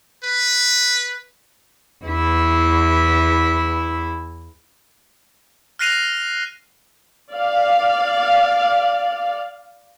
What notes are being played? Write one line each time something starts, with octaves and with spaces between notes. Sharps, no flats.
B4
E2 E4
F6 F#6 A#6 C7 D#7 F7
D5 F5